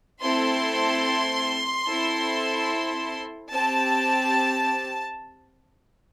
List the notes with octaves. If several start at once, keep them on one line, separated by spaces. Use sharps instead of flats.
A3 C4 E4 A4 C6
C4 E4 A4
C4 G4 A5